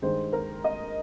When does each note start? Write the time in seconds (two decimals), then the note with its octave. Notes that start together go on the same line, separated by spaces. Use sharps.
0.02 G2 D#3 G#3 C5
0.33 A#4
0.64 D#5